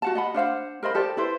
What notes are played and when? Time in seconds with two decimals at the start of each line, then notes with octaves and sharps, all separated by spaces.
0.02 F#4 F#5 A5
0.15 D#5 F#5 B5
0.34 D4 C5 F5 F#5
0.83 A#4 C5 D#5 B5
0.94 G4 A4 C5 D5
1.17 E4 B4 C5